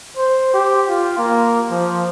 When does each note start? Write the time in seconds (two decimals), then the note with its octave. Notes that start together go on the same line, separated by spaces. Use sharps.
0.17 C5
0.54 G4
0.89 F4
1.18 A#3
1.71 F3